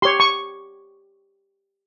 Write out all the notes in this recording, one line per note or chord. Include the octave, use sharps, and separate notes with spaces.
G4 C#5 C6
C#6